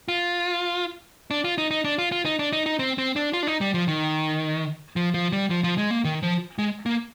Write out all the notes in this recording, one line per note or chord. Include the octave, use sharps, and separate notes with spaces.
F4
D4
F4
D#4
D#4
D4
F4
F4
D#4
D4
D#4
D#4
C4
C4
D4
F4
D4
D#4
G3
F3
D#3
F3
F3
G3
F3
F3
G#3
A#3
D#3
F3
G#3
A#3